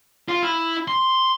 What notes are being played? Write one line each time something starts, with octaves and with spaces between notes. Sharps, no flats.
F4
E4
C6